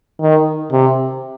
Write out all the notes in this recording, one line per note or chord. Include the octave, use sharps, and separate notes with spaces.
D#3
C3